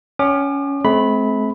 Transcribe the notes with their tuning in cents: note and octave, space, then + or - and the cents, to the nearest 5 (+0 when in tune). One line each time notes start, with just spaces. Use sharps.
C#4 +15 G5 -20 D6 +40
A3 -45 C4 +0 B5 +0